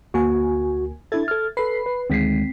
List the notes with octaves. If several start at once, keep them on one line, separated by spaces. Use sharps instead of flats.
D2 A#3 F#4 G#5
D4 E4 A4 E5 G#6 A6
A4 F6
A4 B4 B5 C7
B4
D2 D#3 G#3 C4 B6 C7